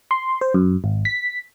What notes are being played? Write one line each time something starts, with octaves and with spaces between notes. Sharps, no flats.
C6
C5
F#2
G#1
B6